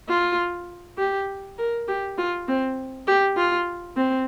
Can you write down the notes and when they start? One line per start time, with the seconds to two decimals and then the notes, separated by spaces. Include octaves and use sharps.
0.09 F4
0.98 G4
1.58 A#4
1.88 G4
2.18 F4
2.48 C4
3.07 G4
3.37 F4
3.96 C4